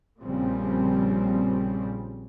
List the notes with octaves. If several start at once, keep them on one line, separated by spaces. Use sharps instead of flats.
A#1 A#2 C#3 F3 G3 C4